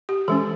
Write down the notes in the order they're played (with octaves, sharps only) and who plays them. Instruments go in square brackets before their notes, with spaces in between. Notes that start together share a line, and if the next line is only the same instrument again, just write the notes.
[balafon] G4
E3 G#3 C#4 A4